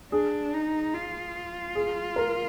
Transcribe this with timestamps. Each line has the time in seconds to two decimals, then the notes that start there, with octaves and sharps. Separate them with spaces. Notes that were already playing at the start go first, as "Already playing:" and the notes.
0.12 D4 G#4
0.54 D#4
0.93 F4
1.75 G#4
2.16 A#4